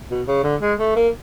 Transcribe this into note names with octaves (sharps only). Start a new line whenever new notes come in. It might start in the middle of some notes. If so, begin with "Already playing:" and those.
B2
C#3
D3
G#3
A3
A#3